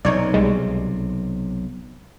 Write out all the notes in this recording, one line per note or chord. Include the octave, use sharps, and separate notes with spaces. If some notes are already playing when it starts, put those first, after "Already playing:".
B1 C3 D#4 C#5 D5
C2 G3 G#3